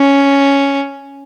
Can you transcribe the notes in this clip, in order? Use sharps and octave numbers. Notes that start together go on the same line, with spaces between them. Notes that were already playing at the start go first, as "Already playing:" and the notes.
Already playing: C#4